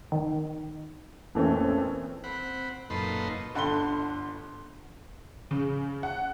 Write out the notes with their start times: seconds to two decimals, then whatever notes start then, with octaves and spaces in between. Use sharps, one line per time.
0.12 D#3
1.35 F2 A#2 E3 A3 C4 C#4
2.24 C4 F#5 B5
2.90 F#2 A#2 D#4 A4 B4 C6
3.55 G1 D3 F#5 B5 C6 G7
5.51 C#3
6.03 F#5